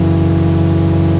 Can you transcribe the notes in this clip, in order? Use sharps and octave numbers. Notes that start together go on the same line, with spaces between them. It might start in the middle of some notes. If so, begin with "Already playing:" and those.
Already playing: F#2 C#3 E3